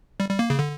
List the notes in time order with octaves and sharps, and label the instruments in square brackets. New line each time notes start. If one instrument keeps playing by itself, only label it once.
[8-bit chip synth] G3
G3
A#3
C#3
D3